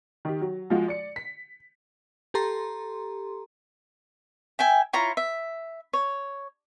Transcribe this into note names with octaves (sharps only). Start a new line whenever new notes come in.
D#3 G4
F#3
F3 G#3 F4 F#4
D5 C#7
B6
G4 A4 A#5 C6
E5 G5 G#5
E4 F4 C#5 A#5
E5
C#5